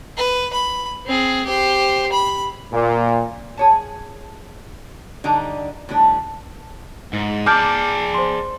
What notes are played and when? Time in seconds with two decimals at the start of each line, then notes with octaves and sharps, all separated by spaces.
0.17 B4
0.53 B5
1.06 C4 G#4
1.46 G4 C5
2.12 B5
2.72 A#2
3.57 G#4 C#5 A5
5.24 D3 G3 D4 D#4 D5 A#5
5.89 A2 D#3 G3 D4
7.13 G#2
7.46 G#4 D5 A5 D6 F6 G6
8.14 C5 C6